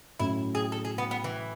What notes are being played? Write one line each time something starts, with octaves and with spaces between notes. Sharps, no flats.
A2 F#3 C#4 E4 F#4
G#4
A4
G#4
B3
B3
E3